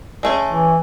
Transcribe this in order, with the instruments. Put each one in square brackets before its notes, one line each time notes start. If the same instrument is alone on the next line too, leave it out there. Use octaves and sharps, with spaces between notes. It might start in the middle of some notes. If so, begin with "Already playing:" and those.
[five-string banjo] G#3 A3 C#4
[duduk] E3